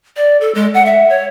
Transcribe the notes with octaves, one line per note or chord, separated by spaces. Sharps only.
D5
A4
G#3
F#5
E5
C#5